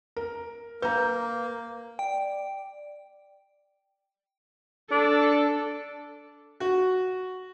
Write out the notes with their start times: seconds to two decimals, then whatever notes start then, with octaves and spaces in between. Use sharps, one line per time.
0.16 A#4
0.82 A#3 B4 A#5 G6
1.99 D5 G5
4.92 D4 A4
6.60 F#4